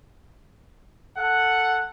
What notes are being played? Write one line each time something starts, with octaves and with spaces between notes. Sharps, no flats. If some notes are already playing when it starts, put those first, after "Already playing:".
A4 F#5